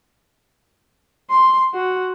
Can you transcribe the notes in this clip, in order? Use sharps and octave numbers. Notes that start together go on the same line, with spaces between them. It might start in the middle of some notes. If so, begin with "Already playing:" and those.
C6
F#4